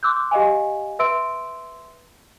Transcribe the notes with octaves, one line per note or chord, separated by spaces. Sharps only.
C6 D6 E6 F#6 G6
G4 D#5 F5 G#5
B4 E5 C6 E6 D7